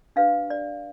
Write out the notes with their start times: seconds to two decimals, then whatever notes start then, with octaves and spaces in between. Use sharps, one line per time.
0.16 D4 G4 B4 F5
0.50 D5